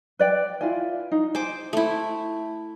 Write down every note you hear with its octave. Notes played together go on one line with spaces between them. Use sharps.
B4 D5 G5
E4 F4 G#5
D#4
C5 G#5 D6
A3 E4